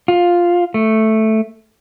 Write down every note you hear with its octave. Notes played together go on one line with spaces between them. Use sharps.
F4
A3